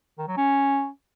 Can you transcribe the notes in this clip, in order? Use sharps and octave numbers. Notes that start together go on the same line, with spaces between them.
D#3
F#3
C#4